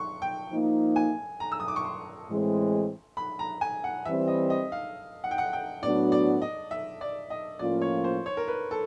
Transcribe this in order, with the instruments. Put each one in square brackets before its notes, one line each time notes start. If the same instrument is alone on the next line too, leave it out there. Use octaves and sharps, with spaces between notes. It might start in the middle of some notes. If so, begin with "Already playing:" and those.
Already playing: [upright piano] C6 C#6
G5
[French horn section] F3 A#3 D#4
[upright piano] G#5
A#5
E6
D#6
D6
C#6
C6
[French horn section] A2 E3 G#3 C4
[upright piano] B5
A#5
G#5
F#5
[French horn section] E3 G3 C4 [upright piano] E5
[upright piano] D#5
D#5
F5
F#5
G5
F#5
G5
[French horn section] A2 F#3 B3 D4 F#4 [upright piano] D5
[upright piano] D5
D#5
E5
D5
D#5
[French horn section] A2 F3 A#3 C#4 F4 [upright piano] D5
[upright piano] C#5
C5
C#5
A#4
B4
A4